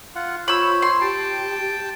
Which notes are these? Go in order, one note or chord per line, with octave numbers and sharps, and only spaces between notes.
F4 F#5
F4 C5 C#5 B5 E6
C6
G4 G5 A5